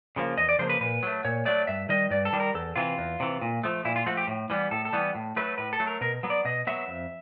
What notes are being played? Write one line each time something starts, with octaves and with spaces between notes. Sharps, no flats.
C#3 F3 A#3
E2 D#5
D5
C#3 F3 A#3 C5
B4
A#2 B4
F#3 A3
A#2 C#5
F#3 A3 D5
G2 E5
D#3 G3 D#5
G2 D5
A4
D#3 G3
A#4
E2 A4
C3 E3 F4
E2
C3 E3
A#2
F3 A3
A#2 E4
F4
F3 A3 F#4
G4
A2
E3 G3 B3
A2 A4
A4
E3 G3 B3
A2
F#3 A3 B4
A2 B4
A4
F#3 A3
A#4
B2 A#4
F#3 B3
D5
B2 D#5
F#3 B3 E5
F2